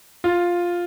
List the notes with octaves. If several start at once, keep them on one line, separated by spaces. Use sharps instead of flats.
F4